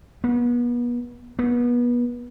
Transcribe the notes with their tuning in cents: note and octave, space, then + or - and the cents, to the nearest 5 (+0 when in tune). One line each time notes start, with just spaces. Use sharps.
B3 -35
B3 -30